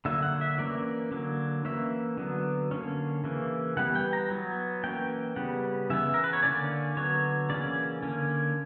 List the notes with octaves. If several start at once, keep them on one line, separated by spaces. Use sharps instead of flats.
D3 F#3 A#3 E5
F#5
E5
E3 A#3 C#4 D5
D3 F#3 A#3
E3 A#3 C#4 E5
D3 F#3 B3
D3 A#3 C#4
C#3 E3 A#3
E3 G3 B3 F#5
G5
A#5
F#3 B3
E3 A#3 C#4 G5
C#3 G3 B3 F#5
C#3 E3 B3 E5
A#4
B4
C#5
D3 A#3 C#4 D5
D3 F#3 B3 C#5
C#3 E3 A#3 C#4 D5
D3 A#3 C#4